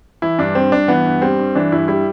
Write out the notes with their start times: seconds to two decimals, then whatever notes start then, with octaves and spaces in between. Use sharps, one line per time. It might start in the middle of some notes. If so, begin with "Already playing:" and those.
0.22 E3 E4
0.38 G2 D4
0.55 G3 C4
0.72 G2 D4
0.88 E3 B3
1.06 G2
1.22 G3 C4
1.39 G2
1.55 E3 D4
1.72 G2 E4
1.88 G3 E4